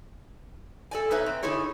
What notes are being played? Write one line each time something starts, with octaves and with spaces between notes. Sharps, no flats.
A4 D5 G#5
B2 D#4 B4 C#5 E5
C4
D3 D#4 E4 G#4 C#5